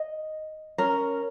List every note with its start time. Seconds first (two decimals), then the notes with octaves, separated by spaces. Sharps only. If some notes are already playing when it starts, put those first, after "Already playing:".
Already playing: D#5
0.78 C#4 A#4